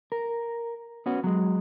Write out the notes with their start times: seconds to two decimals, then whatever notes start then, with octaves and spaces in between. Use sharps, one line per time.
0.12 A#4
1.06 B3 C#4 F#4
1.24 F#3 G#3